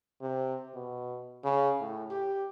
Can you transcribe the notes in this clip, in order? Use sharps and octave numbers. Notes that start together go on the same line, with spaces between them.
C3
B2
C#3
A2
G4